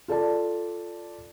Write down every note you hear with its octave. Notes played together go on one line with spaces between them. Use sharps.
F4 A4 D5 A5